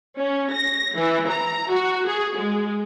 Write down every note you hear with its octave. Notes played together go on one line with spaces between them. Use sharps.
C#4
A#6
E3
A#5
F#4
G#4
G#3